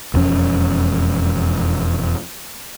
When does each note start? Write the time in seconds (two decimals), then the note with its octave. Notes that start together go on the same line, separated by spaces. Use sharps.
0.14 E1 F2 C#4